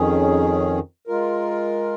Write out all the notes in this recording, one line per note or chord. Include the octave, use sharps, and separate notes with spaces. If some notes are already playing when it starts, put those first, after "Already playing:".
Already playing: F2 D#3 C#4 G#4
G#3 F4 A#4